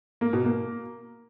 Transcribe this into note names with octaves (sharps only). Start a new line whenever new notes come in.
A#3
B2
A#3